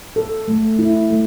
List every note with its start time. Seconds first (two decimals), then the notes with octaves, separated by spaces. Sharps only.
0.16 A4
0.48 A3
0.79 E4
1.11 A3